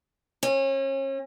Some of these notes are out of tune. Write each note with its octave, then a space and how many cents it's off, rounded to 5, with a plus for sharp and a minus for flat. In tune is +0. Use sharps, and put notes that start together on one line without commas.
C#4 -35